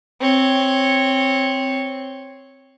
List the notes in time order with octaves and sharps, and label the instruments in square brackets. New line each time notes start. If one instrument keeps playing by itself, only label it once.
[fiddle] C4 C#5